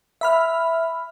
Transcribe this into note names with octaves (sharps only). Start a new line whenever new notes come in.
E5 B5 F6